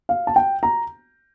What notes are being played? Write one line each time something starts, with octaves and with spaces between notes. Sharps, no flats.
F5
A5
G5
A#5